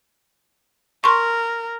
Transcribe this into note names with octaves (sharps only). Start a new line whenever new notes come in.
A#4 C6 C#6